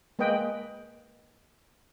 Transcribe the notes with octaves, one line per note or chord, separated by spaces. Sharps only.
G#3 A#3 B4 D#5 G5